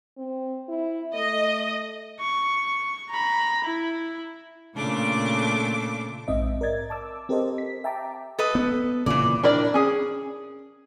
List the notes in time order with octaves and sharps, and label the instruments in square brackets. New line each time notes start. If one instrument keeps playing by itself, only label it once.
[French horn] C4
E4
[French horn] A3 [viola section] D#5
[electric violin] C#6
A#5 B5
E4
[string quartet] A#2 C#3 A3 D4 D6
[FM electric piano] A#1 G#2 C4 D#5 E5
A#4 D5 D#5 G#6 A6
A5 D6 E6
C4 G4 A4 A#4 C5 D#5
B6
E5 G5 A5 A#5 D6
[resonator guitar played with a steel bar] A4 B4 D#5
[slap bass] B3
[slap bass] A#2 C#3 [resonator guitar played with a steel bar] E3 D5
[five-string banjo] D4 E4 A#4 D5
C#4 G#4